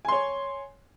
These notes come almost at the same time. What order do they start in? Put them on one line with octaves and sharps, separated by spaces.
G#5 C6 C#5